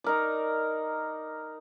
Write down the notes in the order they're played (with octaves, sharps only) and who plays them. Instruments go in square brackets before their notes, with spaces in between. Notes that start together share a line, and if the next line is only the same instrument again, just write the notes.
[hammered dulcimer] D#4 A#4 D5